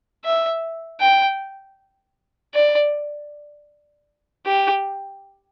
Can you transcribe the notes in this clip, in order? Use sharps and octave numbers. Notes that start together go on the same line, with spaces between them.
E5
G5
D5
G4